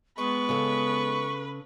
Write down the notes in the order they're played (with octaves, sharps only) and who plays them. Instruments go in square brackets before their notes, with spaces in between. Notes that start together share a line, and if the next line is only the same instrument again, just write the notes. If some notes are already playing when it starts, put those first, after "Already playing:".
[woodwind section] G#3 B3 [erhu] B4 [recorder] C#6
[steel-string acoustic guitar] C#3 A4